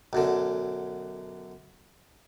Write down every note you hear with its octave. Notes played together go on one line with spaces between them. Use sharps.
B1 F#2 D3